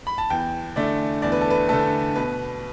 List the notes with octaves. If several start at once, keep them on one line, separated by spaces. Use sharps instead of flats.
B5
A5
E2 G5
D3 A3 D5
E2 D5
B4
A4
B4
D3 A3 A4
B2 B4